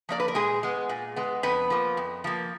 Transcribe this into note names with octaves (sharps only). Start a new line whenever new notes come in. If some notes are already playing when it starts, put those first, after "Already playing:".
F3 A#3 D5
B4
A#4
A#2 G#3 G#4
G#3 B3
A#2
G#3 B3
F2 B3 B4
F3 A#3
F2
F3 A#3